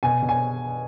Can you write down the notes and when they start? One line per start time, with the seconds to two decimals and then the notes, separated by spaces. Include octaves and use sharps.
0.03 B2 G#5
0.22 B2
0.29 G#5